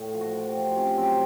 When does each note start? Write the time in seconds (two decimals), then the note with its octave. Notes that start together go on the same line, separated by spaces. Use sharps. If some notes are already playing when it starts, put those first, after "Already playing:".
Already playing: A2
0.13 F3
0.21 F#4
0.35 F3
0.48 G4
0.55 F3
0.76 C3 C#4
0.97 F#3 C4